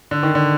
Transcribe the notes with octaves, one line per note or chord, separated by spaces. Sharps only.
D3
D#3
D3